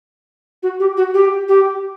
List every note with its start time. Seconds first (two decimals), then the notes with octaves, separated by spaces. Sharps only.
0.63 F#4
0.80 G4
0.97 F#4
1.14 G4
1.48 G4